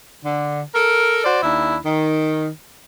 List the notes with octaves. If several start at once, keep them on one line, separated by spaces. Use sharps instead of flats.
D3
A4 A#4
F#4 C5 D5
D#2 D4 E4
D#3